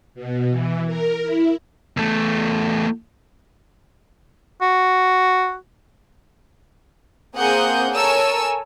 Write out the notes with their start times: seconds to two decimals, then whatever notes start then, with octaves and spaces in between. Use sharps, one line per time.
0.15 B2
0.49 E3
0.86 A#4
1.22 E4
1.97 E2 A3
4.62 F#4
7.36 A#3 C4 G#4 F#5 D#6 G6
7.92 A4 A#4 C#5 G#5 E6